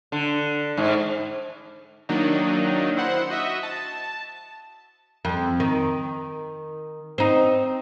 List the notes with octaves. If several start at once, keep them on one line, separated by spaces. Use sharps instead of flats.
D3
G#2
D#3 F#3 A#3 D4 D#4
E4 C5 F#5
F#4 D#5 E5
A5
F2
D#3
C4 D#4